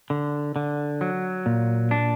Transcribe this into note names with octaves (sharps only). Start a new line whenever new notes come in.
D3
D3
F#3
A#2
D4